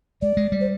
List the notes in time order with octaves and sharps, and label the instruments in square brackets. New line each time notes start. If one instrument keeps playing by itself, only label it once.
[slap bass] G#3 [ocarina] D5
[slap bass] G#3
G3
[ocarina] C5